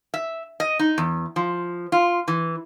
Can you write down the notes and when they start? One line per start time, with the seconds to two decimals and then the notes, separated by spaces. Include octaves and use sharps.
0.14 E5
0.60 D#5
0.79 D#4
0.98 E2
1.36 F3
1.92 F4
2.28 E3